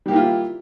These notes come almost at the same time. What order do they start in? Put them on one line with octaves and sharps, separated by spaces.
G3 G4 A#3 E4 F4